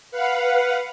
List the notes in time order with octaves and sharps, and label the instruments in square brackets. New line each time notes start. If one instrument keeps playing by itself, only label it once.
[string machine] B4 F5 F#5